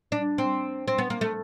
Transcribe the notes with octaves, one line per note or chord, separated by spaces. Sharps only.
D4
C4
C4
B3
A#3
A3